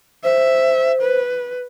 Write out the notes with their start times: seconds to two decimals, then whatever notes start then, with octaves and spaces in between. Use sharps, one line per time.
0.24 C5 E5
1.02 B4